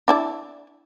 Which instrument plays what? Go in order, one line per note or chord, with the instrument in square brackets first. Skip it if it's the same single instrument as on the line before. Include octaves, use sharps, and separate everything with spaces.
[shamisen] D4 E4 D5